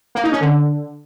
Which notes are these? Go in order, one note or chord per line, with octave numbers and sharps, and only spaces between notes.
A#3
D#4
C#4
D3